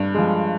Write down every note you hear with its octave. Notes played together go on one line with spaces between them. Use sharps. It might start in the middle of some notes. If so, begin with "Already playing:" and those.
Already playing: G2
F3 G#3